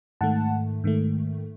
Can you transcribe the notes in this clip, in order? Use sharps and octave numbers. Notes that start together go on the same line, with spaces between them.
G#2 D#3 A3 F#5 A5
G#2 D#3 A3